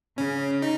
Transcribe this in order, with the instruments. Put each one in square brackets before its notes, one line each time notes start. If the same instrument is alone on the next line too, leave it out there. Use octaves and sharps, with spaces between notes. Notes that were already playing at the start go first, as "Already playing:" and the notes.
[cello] C#3 [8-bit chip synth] C#4
[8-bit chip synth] D#4